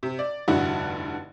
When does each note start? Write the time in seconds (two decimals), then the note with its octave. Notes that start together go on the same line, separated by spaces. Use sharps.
0.03 C3
0.19 D5
0.48 F1 G2 D3 E4 F#4